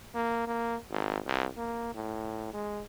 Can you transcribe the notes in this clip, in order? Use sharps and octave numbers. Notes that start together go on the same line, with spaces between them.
A#3
A#3
G#1
C2
A#3
A2
G#3